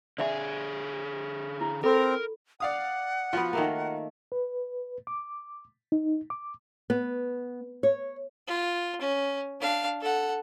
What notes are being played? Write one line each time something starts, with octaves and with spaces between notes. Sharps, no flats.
D3 G#4 D5 E5 C6
E4
C4 A4 A#4 B5
D5 F5 F#5 D#6
F3 B3 F4 F#4
D#3 A3 A#3
B4
D6
D#4
D6
B3
C#5
F4
C#4
D4 F5
A4 F#5